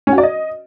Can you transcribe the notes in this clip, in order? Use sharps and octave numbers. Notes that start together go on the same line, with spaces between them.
C#4
F#4
D5
D#5